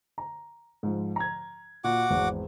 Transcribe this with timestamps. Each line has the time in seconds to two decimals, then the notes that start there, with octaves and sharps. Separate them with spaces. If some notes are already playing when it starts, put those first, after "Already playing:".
0.18 A#5
0.83 G#2 F3
1.16 A#5 G#6
1.84 A#2 F#4 F#5 D6
2.10 G#1 E2